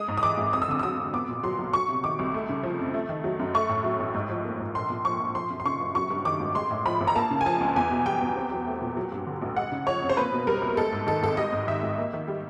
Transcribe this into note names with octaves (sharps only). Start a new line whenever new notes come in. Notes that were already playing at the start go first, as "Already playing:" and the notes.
Already playing: G#3 D#6
G#2
D#6
E3 D6
G#1
F2 D#6
E6
D3 D#6
E6
F#3 D#6
F2
B3 D6
A#2
F#3 C6
B1
F#3 C#6
C3
D#3 D6
C2
A3
C#3
F3
F2
A3
D#3
F#3
F#2
A3 C#6
A2
F#3
A1
G#2
F3
A#3
G#2
A#1 C6
A#2
F3 C#6
A#1
F3 C6
F#2
C6
C#3 C#6
F#1
F#3 C#6
G2
D#3 D6
G#1
G#3 C6
A2
F3 B5
A1
A#5
A#3 A5
C#3
G#5
F3 A5
C#2
E2 G#5
B2
G3 G5
E2
C4
F#3
A3
A#2
F#3
G2
D3
A1
G#3 F#5
C#3
F3 C#5
F2
C5
A#3 B4
B2
G3 A#4
C2
G#3 A4
G#2
D#3 A4
G#1 A4
G3 D#5
G#2
D#3 E5
G#1
A#3
D#3
G3